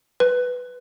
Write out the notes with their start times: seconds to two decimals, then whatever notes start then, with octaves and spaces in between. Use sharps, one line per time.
0.20 B4